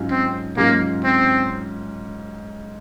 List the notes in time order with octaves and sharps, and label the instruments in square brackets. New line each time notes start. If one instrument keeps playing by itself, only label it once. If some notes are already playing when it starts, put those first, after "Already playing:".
Already playing: [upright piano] G#2 F#3 C#4 F4
[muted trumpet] C4
[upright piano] G#2 F#3 C#4 F4 [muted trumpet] A#3
[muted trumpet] C4